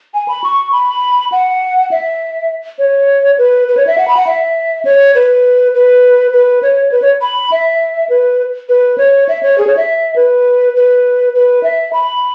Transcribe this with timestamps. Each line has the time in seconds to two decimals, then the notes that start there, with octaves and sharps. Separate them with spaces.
0.14 G#5
0.28 B5
0.44 C#6
0.72 B5
1.32 F#5
1.91 E5
2.79 C#5
3.38 B4
3.68 B4
3.77 C#5
3.87 E5
3.98 F#5
4.08 B5
4.16 F#5
4.27 E5
4.85 C#5
5.15 B4
5.74 B4
6.33 B4
6.63 C#5
6.92 B4
7.02 C#5
7.21 B5
7.52 E5
8.09 B4
8.69 B4
8.98 C#5
9.28 E5
9.43 C#5
9.58 G#4
9.67 C#5
9.77 E5
10.16 B4
10.76 B4
11.35 B4
11.63 E5
11.93 B5